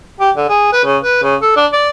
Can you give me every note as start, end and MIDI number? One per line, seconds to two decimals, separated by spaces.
0.20 0.31 67
0.37 0.48 50
0.49 0.70 68
0.73 0.81 71
0.84 0.97 49
1.02 1.22 71
1.23 1.36 49
1.42 1.56 69
1.56 1.67 62
1.73 1.90 74